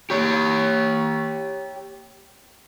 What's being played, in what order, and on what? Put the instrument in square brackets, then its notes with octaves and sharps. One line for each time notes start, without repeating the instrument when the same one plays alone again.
[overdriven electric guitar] G4 C#5